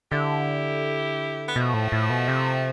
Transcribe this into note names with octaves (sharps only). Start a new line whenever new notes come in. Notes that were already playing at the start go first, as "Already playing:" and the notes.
D3 E4 G4
B3
B2 F3 A3
A2
A2
B2
C3